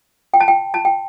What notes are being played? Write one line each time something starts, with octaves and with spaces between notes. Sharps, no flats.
G5
A5
G5
A5
G5